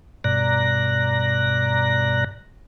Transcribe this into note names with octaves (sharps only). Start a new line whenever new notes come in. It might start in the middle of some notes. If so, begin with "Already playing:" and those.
G2 B2 D5 A#5 F#6 A#6